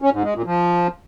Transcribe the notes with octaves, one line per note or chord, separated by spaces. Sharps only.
C#4
G#2
G#3
A#2
F3